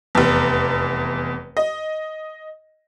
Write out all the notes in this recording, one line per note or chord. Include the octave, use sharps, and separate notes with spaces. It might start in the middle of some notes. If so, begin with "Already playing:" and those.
F1 E2
D#5